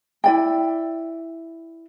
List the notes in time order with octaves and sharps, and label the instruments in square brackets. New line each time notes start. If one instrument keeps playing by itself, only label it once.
[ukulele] E4 D5 G5